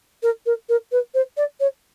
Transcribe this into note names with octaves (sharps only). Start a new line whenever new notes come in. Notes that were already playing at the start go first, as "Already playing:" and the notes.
A#4
A#4
A#4
B4
C5
D5
C#5